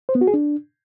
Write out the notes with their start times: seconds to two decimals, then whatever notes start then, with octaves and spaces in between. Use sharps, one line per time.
0.09 C5
0.15 B3
0.21 F#4
0.27 G#4
0.34 D4